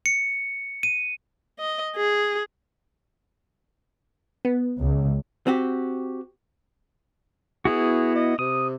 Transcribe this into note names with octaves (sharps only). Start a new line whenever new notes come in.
C#7
D#7
D#5
G#4
B3
C#2
C4 F#4 G4
B3 E4 F#4 G#4
D#5
C3 D#6